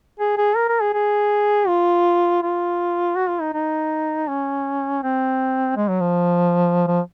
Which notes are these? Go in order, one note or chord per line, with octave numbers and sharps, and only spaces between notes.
G#4
G#4
A#4
A#4
G#4
G#4
F4
F4
F#4
F4
D#4
D#4
C#4
C4
G#3
F#3
F3
F3